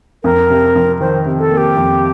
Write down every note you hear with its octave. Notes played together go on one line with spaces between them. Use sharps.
F2 A#4
C3
F2
D#3 C5
C3
A4
A#3
G4
F2